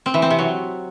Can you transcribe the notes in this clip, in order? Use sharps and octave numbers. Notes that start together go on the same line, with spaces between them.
C4
E3
C4
C3
F#3